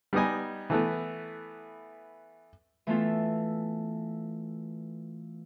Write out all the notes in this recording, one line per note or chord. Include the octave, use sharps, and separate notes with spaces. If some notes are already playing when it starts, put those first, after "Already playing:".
G3 B3 D#4 D#5 G#5
E3 A3 B3
E3 A3 B3 F4 A4